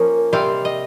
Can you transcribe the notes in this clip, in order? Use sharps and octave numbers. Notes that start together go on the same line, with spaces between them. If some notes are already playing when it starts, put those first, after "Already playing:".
Already playing: F3 A#3 C#4
C3 G3 C4 F5
D#5